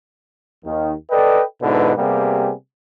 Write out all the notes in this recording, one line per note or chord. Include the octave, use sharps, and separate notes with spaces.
D#2 D#3
A4 B4 D5 D#5 G5
G#2 B2 D3 E4 B4
C3 G3 A#3 B3 G4 G#4